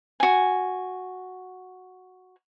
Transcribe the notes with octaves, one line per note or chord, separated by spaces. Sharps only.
F#4 G#5